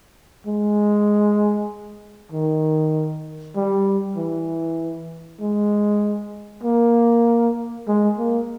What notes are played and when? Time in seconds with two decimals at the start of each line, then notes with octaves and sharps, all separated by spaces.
0.47 G#3
2.32 D#3
3.56 G3
4.17 E3
5.41 G#3
6.63 A#3
7.88 G#3
8.18 A#3